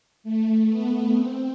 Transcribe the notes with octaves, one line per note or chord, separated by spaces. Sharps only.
A3
B3
C4